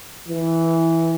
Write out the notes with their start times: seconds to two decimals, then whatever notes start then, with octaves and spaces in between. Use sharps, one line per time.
0.28 E3